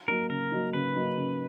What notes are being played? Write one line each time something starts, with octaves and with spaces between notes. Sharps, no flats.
F#3 A#3 D#4 A#4
C#3 A#4
F#3 A#3 D#4
C#3 B4
F#3 A#3 D#4
C#3